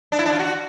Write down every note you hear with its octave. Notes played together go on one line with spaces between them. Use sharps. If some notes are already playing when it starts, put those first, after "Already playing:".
D4
E4
D4
F4
F#4